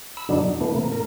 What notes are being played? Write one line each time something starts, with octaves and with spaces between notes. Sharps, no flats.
B5 E6
F#2 B2 D3 F#3 D4 D#4
E2
B2 E3 A3 B3
C3 A#3
A2 A#4